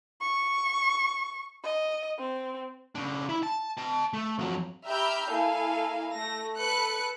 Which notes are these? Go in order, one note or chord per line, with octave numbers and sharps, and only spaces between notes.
C#6
D#5
C4
C#3 D4
E4 B5
A5
D#5 A5
A3
F2 F#3
G4 E5 A#5 B5 F6 G6
A#3 E4 A4 F5 G#5
A3 A#6
A4 B4 F#6 C#7